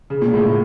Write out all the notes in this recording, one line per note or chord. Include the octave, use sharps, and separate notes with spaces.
C#3
A#2
A2
A2